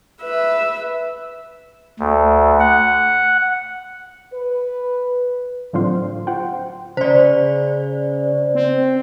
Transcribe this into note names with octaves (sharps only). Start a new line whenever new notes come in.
B4 E5
D2
F#5
B4
A2 D3 F#3 C4 F4 C5
F4 C5 F#5 G5
C#3 C5 D5
C4